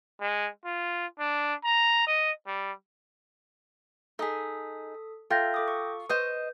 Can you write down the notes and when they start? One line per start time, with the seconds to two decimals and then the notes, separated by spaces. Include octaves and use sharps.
0.20 G#3
0.65 F4
1.19 D4
1.64 A#5
2.07 D#5
2.47 G3
4.19 D#4 G#4 A4 D#6 B6
5.31 F4 A4 E5 G5 G6 A#6
5.54 A4 D6 D#6
5.68 C#6
6.09 B4 C5 D#5 D#6 G6